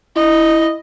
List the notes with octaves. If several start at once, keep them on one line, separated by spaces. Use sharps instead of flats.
E4 D#5